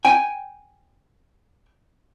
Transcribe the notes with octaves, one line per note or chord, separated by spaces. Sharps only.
G5 G#5